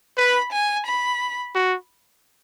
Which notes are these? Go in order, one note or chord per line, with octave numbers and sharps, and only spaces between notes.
B4 B5
G#5
B5
F#4